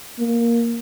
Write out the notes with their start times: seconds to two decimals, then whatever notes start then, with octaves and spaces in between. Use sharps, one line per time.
0.20 A#3